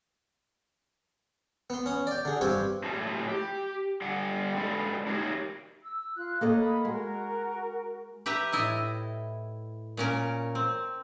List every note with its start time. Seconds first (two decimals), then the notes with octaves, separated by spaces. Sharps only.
1.70 B3 C6
1.86 C#4 D#6
2.07 D5 G5
2.25 D3 G#4
2.41 G2 C4 G4 G#5 C#6
2.84 A2 F#3 G4 A5
3.28 G4
4.02 D3 G3 G4 F#5
4.56 G#3 D4 A4 B4 D5 F5
5.07 D4 D#4 F#4 G4 A#4 C#5
5.82 E6
6.16 F4 F#6
6.41 A#3 A4 C#5 D#5
6.58 B5 D#6
6.85 G#3 F#4 A#4
8.26 G4 B4 E5 A#5
8.53 A2 E4 D#5
9.97 A#2 C#4 A#4
10.55 C4